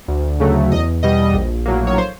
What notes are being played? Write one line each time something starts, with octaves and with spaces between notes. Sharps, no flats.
D2
C#3 F#3 A3
E2 D#5
B2 G3 D#5
A#1
A2 F#3 A#3
C#5
C5